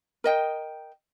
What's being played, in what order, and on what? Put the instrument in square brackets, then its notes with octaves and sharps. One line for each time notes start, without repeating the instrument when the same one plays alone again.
[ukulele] A#4 D#5 G5